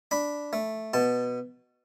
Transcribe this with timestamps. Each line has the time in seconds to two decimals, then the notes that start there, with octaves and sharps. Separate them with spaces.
0.11 D4 B5
0.53 A3
0.94 B2 A5